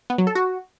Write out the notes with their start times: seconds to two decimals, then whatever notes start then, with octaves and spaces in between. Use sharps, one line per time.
0.10 B3
0.18 F#3
0.27 A4
0.35 F#4